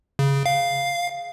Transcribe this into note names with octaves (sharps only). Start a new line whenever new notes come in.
C#3
F5